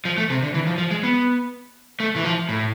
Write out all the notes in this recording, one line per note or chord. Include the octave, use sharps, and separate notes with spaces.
F3
A3
C3
D3
E3
F3
F3
G#3
B3
A3
E3
F3
A2